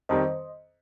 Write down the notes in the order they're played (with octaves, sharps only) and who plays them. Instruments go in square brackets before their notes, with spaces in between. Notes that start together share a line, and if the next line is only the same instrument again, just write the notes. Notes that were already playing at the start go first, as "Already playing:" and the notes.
[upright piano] F2 D#3 G3 C4 [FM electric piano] C5 D#5